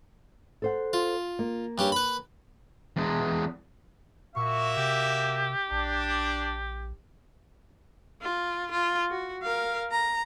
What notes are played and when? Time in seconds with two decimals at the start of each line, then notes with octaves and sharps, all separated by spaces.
0.62 A4 C5 F#5
0.93 F4
1.39 A#3
1.78 G2 C#4 G4
1.92 B4 B5
2.97 E2 G#3
4.36 A#2 A#3 F#4 E5 C#6
4.77 C3 G4
5.71 A#1 D4
8.22 F4
8.71 F4
9.10 F#4
9.43 A#4 F5
9.91 A#5